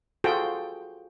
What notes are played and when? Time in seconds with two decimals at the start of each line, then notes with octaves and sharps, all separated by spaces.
0.24 F4 F#4 G#4 A4 C5 G5